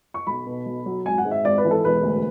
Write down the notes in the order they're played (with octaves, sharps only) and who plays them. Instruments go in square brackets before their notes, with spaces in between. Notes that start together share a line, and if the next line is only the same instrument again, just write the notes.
[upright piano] C#6
B1 B5
B2
B1
F#3
G#1 G#5
F#5
G#2
E5
G#1 D5
B4
E3
A4
E1 B4
D2